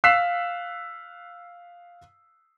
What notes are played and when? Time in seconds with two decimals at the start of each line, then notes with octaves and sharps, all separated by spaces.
0.04 F5 E6 F#6 B6 C7 E7